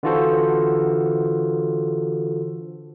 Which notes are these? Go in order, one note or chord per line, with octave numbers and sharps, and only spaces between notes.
D3 E3 F4 F#4 A4 C5